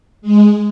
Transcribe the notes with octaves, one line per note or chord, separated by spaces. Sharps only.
G#3